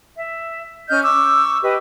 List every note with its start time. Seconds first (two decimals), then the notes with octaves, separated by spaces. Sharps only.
0.16 E5
0.89 C#4 D#5 F6 G6
1.03 C#6 D6 E6
1.63 G4 B4 D#5